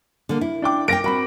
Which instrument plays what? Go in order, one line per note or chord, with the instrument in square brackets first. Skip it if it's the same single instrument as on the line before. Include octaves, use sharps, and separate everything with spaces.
[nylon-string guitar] D3 A#3
E4
[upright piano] D4 G5 D6
[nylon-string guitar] A#4 F5 G5 [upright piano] A#6 D7
[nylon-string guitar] C4 F#4 [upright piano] A#4 B5